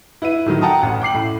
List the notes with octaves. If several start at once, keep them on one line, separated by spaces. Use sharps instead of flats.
E4 B4 E5 D#7
A2 D#3 F#3
F#5 G5 A5 A#5 D#6
A1 F#5
G5 D6 C7 F#7
A2